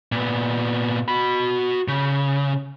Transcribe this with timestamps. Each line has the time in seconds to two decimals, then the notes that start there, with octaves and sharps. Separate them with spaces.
0.12 A#2 B3
1.08 F#4 B5
1.88 C#3